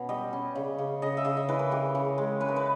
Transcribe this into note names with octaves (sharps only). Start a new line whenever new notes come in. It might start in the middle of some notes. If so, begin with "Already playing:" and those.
Already playing: B2 C#4
G3 D#5
C#4
C#3
C#3
C#3 D#5
E5
C#3 D#5
D#5
E3 B4
A#4
C#3 G4
C#3
G#3
C#4 B4
A#4
B4